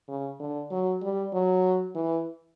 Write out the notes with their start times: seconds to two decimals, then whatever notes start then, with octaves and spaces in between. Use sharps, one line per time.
0.08 C#3
0.40 D3
0.71 F#3
1.02 G3
1.34 F#3
1.95 E3